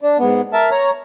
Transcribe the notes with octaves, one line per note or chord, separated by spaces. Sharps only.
D4
G#2 B3
A#4 E5 A5
C#5 A#5